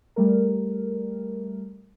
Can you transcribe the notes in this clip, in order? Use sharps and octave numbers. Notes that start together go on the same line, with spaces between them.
G3 A3 A#4